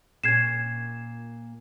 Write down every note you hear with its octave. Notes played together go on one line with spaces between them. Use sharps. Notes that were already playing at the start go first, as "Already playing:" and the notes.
A#2 C#4 G#6 C7 E7